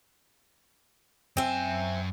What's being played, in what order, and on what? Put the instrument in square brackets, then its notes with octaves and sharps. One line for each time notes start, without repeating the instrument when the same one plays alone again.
[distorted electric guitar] F#2 G#5 [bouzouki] C4 E5